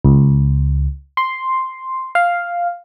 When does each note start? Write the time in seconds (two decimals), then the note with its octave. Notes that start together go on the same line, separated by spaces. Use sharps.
0.05 C#2
1.17 C6
2.15 F5